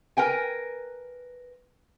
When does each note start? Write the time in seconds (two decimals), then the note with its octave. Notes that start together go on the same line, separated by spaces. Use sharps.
0.17 A#4 B4 G5 G#5